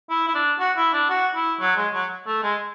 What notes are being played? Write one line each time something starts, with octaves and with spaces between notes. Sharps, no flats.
E4
E4
D4
F#4
E4
D4
F#4
E4
F#3
G#3
F#3
A3
G#3